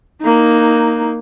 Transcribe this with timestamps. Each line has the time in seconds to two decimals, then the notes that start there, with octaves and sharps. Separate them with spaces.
0.22 A#3 D#4